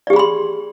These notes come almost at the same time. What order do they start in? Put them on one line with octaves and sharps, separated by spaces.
D5 G4 G#4 B5 C6